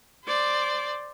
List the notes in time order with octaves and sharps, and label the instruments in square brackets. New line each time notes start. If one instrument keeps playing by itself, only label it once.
[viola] C5 D5